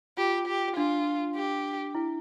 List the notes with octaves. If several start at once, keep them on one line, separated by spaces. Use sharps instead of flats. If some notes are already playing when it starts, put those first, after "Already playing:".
F4 G4
G4
D4 F4
G4
E4